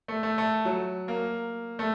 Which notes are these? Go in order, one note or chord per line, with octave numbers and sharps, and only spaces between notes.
A3
A3
A3
F#3
A#3
A3